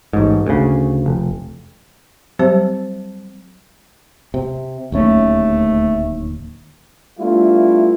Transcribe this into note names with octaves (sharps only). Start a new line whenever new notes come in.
A1 G#2
D2 C#3
F1
F#3 G3 C4 G4 C5 A5
C3
D1 D#2 A3 C#4
G3 A3 B3 D4 E4 F4